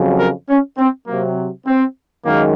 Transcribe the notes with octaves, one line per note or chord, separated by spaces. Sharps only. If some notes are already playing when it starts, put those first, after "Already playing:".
Already playing: F2 C#3 F#3
A#4
C#4
C4
C3 F#3 A#3
C4
F#2 D#3 G#3 A#3